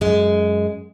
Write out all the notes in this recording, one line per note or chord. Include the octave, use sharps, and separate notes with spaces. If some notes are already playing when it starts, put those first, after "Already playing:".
F#2 G#3